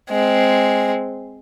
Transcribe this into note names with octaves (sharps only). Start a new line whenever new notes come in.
G#3 C4